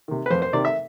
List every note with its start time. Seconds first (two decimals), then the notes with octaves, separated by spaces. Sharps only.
0.08 C3 D#3
0.26 B4
0.31 F2 C5
0.42 C5
0.53 C3 D#3 D5
0.65 E5